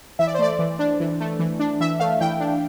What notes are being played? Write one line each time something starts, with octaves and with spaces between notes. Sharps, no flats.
E3 E5
D5
C5
A3 D5
E3
D4
E3
A3
E3
D4
E3 E5
A3 F5
E3 G5
D4